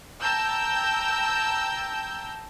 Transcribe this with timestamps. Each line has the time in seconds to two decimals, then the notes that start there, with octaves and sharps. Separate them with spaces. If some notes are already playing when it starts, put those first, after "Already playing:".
0.20 G5 A5 A#5 E6 G6